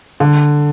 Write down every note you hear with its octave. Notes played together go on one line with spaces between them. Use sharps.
D3